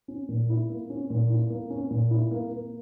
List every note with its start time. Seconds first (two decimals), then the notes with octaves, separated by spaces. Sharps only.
0.08 C#4
0.28 A#2
0.50 E4
0.70 A#3
0.90 C#4
1.10 A#2
1.30 E4
1.50 A#3
1.70 C#4
1.90 A#2
2.11 E4
2.31 A#3
2.51 A#3